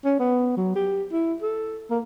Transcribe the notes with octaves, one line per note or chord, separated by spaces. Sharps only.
C#4
B3
F#3
G4
E4
A4
A#3